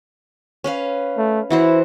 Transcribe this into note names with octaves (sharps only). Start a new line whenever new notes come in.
C#4 B4 F5
A3
E3 E4 F#4 C5